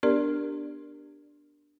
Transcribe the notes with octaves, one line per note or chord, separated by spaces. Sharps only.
B3 D4 G4 A#4 D5